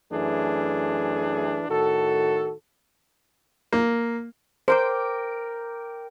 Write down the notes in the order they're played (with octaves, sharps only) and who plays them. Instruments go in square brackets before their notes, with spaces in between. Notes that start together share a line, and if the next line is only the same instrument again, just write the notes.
[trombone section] F#2 E3 A3 D4 G#4
A2 D#3 F#4 A4
[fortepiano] A#3
[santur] A#4 G5 D6 [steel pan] C5